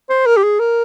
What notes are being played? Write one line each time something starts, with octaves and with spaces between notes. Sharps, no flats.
C5
A#4
G4
G#4
A#4